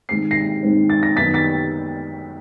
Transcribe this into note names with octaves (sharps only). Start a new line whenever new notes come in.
G#1 G#2 D#3 G#3 C4 C7
A#6 C7
G#1 G#2 D#3 G#3 C4
A6
A#6
F#2 D#3 G3 B3 A6 B6
A6 B6